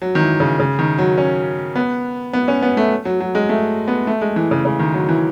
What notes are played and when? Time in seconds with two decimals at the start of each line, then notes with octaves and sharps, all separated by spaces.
0.02 F#3
0.15 D#3
0.21 E3
0.40 C#3
0.60 C#3
0.79 D#3
0.98 F#3
1.18 C#4
1.76 B3
2.33 B3
2.48 C#4
2.62 B3
2.77 A3
3.05 F#3
3.20 F#3
3.35 G#3
3.49 A3
3.88 B3
4.07 A3
4.21 G#3
4.36 E3
4.51 C#3
4.65 C#3
4.79 D#3
4.94 F#3
5.09 E3